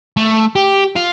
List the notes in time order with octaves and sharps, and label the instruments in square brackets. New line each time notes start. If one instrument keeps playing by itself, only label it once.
[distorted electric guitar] A3
G4
F4